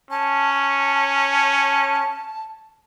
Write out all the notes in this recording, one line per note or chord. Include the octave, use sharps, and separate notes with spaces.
C#4 A5